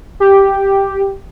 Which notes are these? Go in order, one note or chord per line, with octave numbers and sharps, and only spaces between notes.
G4